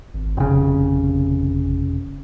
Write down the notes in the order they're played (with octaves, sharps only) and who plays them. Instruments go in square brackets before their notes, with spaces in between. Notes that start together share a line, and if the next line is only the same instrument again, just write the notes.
[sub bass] G#1
[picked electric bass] F1 C#3